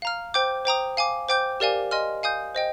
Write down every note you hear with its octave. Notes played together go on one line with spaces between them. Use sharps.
F5 A#5 F6
C5 G5 D6 G6
C5 G5 A#5 D#6
F5 G#5 D6
C5 G5 D6 G6
G4 A#4 D5 F5 G#5
D#5 G#5 C6 F6
F5 G#5 D#6 G6
C5 D#5 G5